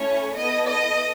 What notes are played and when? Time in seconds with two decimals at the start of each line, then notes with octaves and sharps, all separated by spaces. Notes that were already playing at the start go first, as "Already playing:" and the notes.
Already playing: A3 C#4 E4 C#5
0.37 B3 E4 A4 D#5
0.67 D#5